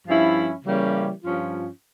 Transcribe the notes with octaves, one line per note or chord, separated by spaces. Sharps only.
G2 F3 C#4 E4
C#3 E3 G3 A#3 C#4
G2 F3 C#4 F4